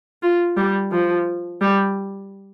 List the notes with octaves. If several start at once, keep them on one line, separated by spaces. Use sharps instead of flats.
F4
G3
F3
G3